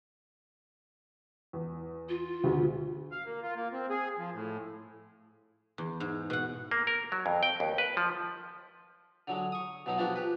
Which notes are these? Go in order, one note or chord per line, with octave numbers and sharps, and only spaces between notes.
E2
F4
D2 B2 G#4
F5
A#3
F4
A#3
C4
G#4
F3
A2
E2
G#2
B2 F#5
A#3
A#4
F#3
F2
G5
D#2
B4
F3
D3 F#3 G#3
C#6 D#6
B2 F#3 D#4
F3 G#3 B3 D4 F#4 G4
G4 B4